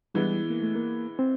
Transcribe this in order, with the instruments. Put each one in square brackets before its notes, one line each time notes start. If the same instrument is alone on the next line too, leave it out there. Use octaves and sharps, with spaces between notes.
[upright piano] E3 G#3 B3 [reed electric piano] G3
[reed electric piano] A#3
A3
A#3
C4